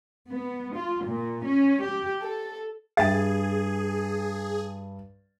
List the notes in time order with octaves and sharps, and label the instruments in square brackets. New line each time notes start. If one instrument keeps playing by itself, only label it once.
[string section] B3
F4
A#2
C#4
G4
A4
[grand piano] G2 A6 [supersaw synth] G#4 [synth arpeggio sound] E5 G5